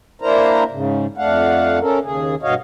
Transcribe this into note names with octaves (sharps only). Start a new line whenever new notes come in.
A#3 D4 E4 A#4 C5 A#5
G#2 C#3
F2 A3 D4 F5 F#5
C#4 A4 A#4
D#2 C#3 G#4
G2 B2 F#4 C#5 D#5 F5